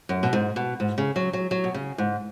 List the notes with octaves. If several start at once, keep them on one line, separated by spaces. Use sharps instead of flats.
F#2
B2
G#2
B2
G#2
C#3
F#3
F#3
F#3
B2
C#3
G#2